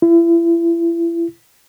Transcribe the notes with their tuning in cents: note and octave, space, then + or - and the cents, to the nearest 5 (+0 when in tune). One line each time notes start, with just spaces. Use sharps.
E4 +35